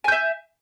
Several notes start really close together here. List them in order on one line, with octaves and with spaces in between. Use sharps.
G#5 G6 E5